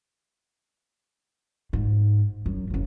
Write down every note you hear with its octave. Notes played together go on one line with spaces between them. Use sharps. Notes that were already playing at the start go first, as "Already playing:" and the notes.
G#2
F#2
F#1 F#2